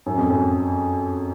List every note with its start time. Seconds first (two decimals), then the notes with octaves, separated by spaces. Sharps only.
0.06 F#2
0.18 F2
0.29 F#2